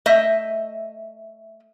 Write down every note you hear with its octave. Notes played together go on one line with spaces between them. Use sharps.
A3 D#5 E5